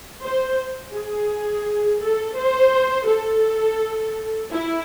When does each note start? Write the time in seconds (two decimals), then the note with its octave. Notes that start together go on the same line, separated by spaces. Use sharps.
0.22 C5
0.93 G#4
2.01 A4
2.37 C5
3.08 A4
4.51 E4